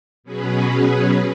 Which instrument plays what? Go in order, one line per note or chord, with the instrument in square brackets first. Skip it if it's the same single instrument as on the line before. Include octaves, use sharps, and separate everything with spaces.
[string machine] B2 F#3 C#4 G#4 B4